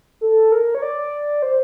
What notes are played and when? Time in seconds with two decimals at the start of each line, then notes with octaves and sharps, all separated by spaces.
0.21 A4
0.52 A#4
0.75 C#5
0.82 D5
1.42 C5